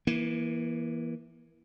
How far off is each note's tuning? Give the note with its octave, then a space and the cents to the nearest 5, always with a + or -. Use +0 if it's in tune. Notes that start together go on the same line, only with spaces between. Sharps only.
E3 +0 A#3 +35